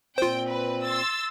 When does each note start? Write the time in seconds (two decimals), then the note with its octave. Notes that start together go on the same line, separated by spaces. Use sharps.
0.18 A#2 C4 F4 C5 G5
0.49 B4
0.84 C6 E6 A6